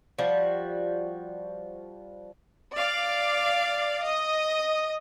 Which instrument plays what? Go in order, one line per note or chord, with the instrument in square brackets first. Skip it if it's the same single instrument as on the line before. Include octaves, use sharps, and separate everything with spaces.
[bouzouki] F3 G3 F#4
[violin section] D5 F5 D6
D#5